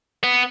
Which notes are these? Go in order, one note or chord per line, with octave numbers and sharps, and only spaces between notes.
B3